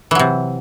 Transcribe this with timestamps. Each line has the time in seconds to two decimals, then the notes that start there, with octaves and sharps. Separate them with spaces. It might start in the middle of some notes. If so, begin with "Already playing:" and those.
0.11 E3
0.15 F#3
0.19 C3